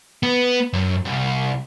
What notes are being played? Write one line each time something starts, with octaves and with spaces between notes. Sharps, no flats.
B3
F#2
C2